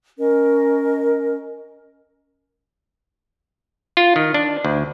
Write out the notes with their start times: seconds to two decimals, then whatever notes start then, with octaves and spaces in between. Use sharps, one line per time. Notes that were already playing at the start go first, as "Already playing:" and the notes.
0.20 C#4 A#4 D#5
3.97 F4
4.16 D#3
4.34 D4
4.65 D2